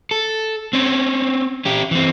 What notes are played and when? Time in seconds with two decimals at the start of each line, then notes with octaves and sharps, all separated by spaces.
0.11 A4
0.73 C4 C#4
1.65 C#4 G4
1.91 E3 C4